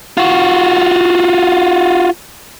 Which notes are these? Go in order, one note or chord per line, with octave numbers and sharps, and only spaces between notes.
F4 F#4